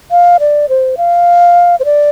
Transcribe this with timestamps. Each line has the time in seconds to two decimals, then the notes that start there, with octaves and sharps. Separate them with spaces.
0.11 F5
0.40 D5
0.69 C5
0.97 F5
1.80 C5
1.85 D5